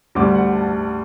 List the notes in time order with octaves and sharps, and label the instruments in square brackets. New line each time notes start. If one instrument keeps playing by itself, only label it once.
[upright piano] D2 D3 G3 D6
F#5
A5